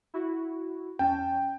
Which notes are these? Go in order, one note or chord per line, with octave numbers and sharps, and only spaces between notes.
E4 F#4
E2 C#4 G5 A5